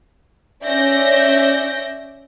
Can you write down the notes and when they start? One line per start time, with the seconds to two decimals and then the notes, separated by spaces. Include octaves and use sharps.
0.64 C#4 D5 E5 G6 A#6